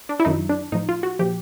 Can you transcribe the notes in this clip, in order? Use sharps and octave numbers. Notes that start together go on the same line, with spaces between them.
D4
E4
F#2 D#3 F#3 D#4
D4
A2 F3 D#4
F4
F#4
A#2 F3 G4